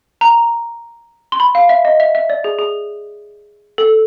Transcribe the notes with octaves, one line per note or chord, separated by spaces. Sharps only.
A#5
C6
B5
F5
E5
D#5
E5
E5
D5
G#4
G#4
A4